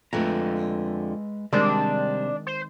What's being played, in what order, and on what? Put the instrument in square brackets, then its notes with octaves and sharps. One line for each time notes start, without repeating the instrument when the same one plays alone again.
[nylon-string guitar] F2 D3 A3 [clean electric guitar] G#3 B4 A#5
[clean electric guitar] C3 C5 [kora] D#3 G#3 C4 [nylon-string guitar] G3 [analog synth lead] D4
[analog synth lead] C5